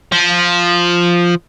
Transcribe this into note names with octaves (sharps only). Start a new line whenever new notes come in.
F3